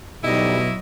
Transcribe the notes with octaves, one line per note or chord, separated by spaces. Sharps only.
D2 B2 F#3 G3 D#4 E4 D#5